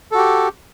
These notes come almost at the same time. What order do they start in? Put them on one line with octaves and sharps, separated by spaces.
A4 F#4 G4